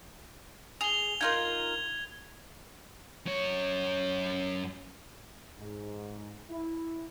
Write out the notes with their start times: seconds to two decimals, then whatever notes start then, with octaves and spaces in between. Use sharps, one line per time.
0.81 G#4 F7 G7
1.21 D#4 F4 A#4 G#6
3.26 F#2 C#5
5.60 G#2
6.50 E4